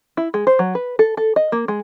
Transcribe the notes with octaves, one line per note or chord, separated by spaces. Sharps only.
E4
G#3
C5
F#3
B4
A4
A4
D#5
A#3
G#3